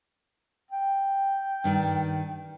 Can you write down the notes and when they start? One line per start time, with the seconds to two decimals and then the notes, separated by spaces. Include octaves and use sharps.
0.71 G5
1.64 G2 D#3 D5